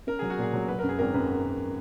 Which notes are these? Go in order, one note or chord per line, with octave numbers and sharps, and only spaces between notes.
C#4 A#4
F#3 G#4
F#4
A#2 G#4
F#3
F#3 B4
A#4
F#2
G#4
G#1 A#4
F#2 B4